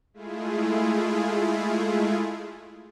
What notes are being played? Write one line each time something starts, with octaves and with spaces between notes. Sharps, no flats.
G#3 A3 E4 F4 G#4